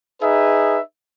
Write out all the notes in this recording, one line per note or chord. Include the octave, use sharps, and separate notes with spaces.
D#4 G#4 B4 E5